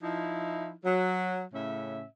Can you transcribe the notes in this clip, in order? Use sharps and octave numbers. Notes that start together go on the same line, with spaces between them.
F3 D#4 E4
F#3
A2 C#3 C#4 E5